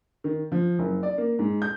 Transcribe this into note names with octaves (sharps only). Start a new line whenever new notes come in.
D#3
F3
F#1
D5
A#3
G#2
G6